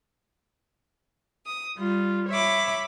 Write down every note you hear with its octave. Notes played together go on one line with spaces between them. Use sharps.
D#6
G3 F4
C#5 E5 B5 D6